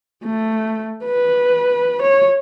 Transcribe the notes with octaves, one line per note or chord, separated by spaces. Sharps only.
A3
B4
C#5